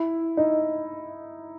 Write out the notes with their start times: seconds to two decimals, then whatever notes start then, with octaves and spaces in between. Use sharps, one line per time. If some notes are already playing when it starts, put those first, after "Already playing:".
Already playing: E4
0.37 D#4